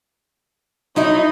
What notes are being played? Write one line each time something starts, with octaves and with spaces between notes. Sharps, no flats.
F#3 D#4 E4 D#5